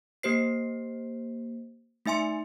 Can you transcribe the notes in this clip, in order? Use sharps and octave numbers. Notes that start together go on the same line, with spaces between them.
A#3 G4 C5 C7
A3 D#4 E5 G#5 C6 C#7